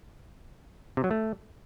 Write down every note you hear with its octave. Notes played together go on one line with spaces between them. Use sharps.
C3
F#3
A3